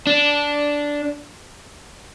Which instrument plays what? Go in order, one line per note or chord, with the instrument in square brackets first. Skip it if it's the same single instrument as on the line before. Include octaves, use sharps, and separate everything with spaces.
[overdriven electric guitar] D4